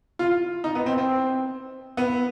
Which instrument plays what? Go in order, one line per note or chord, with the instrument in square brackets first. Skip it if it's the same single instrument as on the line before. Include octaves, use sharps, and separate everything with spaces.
[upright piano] F4
D#4
B3
C4
C4
B3